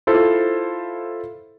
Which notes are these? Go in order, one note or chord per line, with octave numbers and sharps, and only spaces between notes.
E4 F4 A4 C5